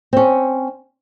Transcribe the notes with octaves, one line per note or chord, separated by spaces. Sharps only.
C4 C#4